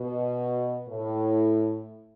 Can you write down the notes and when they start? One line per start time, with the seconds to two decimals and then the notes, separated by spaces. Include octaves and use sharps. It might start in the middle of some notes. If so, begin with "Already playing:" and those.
Already playing: B2
0.89 A2